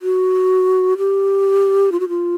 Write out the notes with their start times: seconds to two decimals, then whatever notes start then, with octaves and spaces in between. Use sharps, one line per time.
0.02 F#4
0.98 G4
1.92 F4
2.00 F#4
2.09 F4